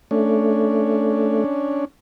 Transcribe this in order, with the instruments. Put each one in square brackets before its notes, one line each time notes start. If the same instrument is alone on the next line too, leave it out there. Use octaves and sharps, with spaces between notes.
[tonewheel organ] A3 [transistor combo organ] C#4 D4